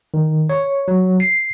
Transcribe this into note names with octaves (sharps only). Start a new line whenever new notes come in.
D#3
C#5
F#3
C7